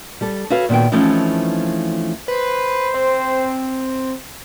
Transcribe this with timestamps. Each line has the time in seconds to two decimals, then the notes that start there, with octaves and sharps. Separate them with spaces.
0.21 G3 A4
0.50 F#4 A4 B4 C#5 F5
0.69 A#2 D#3 B3 F#4 G5
0.92 E3 F3 A3 C4 C#4 D#4
2.28 B4 C5
2.94 C4